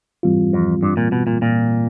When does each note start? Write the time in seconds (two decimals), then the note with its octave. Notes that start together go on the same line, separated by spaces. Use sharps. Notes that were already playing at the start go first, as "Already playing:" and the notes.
0.23 G#2 E3 G3 C4 F4
0.53 F2
0.83 G2
0.97 A#2
1.12 B2
1.27 A#2
1.42 A#2